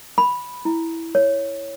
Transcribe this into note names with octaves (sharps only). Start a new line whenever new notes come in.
B5
E4
C#5